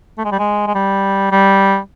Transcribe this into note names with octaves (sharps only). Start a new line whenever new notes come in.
A3
G#3
G3
G#3
G#3
G3
G3